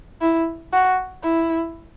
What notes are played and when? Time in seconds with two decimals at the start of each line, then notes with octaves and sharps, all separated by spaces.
0.21 E4
0.73 F#4
1.22 E4